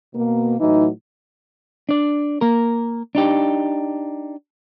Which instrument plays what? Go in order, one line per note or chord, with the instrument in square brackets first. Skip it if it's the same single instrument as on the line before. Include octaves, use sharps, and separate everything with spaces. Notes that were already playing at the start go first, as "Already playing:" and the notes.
[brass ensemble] B2 A#3
A2 E3 F#3 D#4
[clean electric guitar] D4 D5
A#3 A#4
D4 D#4 G4